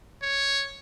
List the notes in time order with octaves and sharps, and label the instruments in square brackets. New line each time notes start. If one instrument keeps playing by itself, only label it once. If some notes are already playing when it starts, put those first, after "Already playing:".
[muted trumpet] C#5